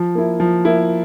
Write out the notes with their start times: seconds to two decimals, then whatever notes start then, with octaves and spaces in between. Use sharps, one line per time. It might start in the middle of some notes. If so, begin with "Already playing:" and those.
Already playing: F3
0.15 A#3 E4
0.40 F3
0.65 A#3 E4